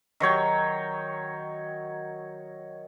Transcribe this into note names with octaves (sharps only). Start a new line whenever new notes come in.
D#3 F#3 C#5 G5